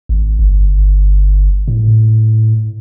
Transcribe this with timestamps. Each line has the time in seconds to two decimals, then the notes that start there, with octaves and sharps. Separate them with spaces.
0.09 G#1
0.39 G1
1.68 A2